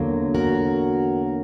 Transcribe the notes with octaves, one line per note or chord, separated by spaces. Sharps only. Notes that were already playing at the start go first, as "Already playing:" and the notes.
Already playing: E2 D3 F#3 A#3
F#4 A#4